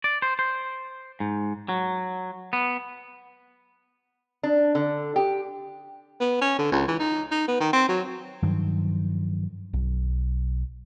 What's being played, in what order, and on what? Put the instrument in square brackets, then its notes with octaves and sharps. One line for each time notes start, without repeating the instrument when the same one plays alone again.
[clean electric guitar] D5
C5
C5
G#2
F#3
B3
[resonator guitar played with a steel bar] D4
D3
G4
[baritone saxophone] B3
C#4
D3
C#2
E3
D#4
D#4
B3
D#3
C4
F#3
[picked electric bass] G2 D#3 F3 F#3
B1